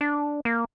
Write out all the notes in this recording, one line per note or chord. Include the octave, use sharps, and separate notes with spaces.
D4
A#3